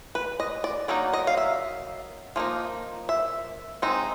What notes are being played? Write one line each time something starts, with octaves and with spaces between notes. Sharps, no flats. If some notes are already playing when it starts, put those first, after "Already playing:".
B4
D#5
D5
F#3 A#3 D#4 D5
D#5
F5
E5
F3 A#3 D#4
E5
G#3 C4 D#4